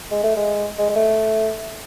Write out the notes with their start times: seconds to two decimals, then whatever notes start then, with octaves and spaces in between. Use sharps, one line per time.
0.11 G#3
0.23 A3
0.36 G#3
0.78 G#3
0.89 G#3
0.96 A3